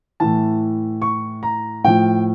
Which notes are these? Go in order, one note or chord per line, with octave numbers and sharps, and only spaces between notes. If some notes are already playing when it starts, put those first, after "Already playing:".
A2 E3 A5
C#6
A#5
A2 F3 G5